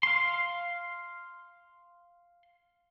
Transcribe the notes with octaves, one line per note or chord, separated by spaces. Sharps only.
F5 C6